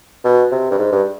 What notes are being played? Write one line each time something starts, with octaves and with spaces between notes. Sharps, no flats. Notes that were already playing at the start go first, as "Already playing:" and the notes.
B2
C3
G2
G#2
G2